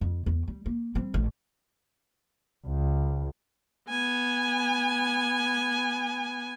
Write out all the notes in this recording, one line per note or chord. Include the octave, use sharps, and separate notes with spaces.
F2
E2
G3
A#3
G3 C4
A1
C#2
B3 G#5